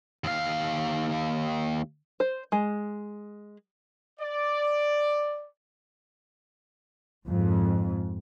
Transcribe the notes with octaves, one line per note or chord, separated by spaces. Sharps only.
D#2 F5
C5
G#3
D5
F2 G#2